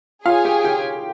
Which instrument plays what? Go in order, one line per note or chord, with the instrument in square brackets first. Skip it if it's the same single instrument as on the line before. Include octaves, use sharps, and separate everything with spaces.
[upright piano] F4 F5 [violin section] G#4 C#5 G#5
[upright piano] G4 G5
G4 G5